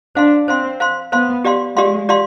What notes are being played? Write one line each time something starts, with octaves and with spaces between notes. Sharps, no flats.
D4 C5 F5 C6
C4 C5 F5 C6
C5 F5 C6
B3 C5 F5 C6
G4 D5 F5 C6
G#3 G4 D5 F5 C6
G4 D5 F5 C6